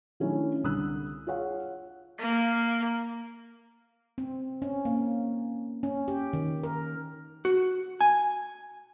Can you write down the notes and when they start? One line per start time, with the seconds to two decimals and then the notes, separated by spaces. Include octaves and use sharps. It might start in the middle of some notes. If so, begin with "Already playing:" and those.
0.20 D#3 F#3 A3 C#4 D4 E4
0.64 C2 D3 D#6 E6 F#6
1.27 F4 G#4 C#5 F5 F#5
2.19 A#3
4.18 C4
4.62 C#4
4.85 A#3
5.83 C#4
6.08 G4
6.33 D#3
6.63 A#4
7.45 F#4
8.01 G#5